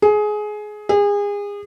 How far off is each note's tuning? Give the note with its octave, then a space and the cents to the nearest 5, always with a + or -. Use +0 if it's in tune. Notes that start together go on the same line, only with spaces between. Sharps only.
G#4 +20
G#4 -30